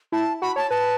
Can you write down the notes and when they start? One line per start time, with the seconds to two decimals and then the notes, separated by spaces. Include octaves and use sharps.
0.12 E4 A5
0.41 F#4 B5
0.56 C#5 A5
0.70 B4 A5